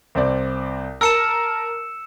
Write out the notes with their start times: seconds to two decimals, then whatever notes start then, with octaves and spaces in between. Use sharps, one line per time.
0.15 C2 C4 D5
1.01 A#4 A5 E6 C#7 E7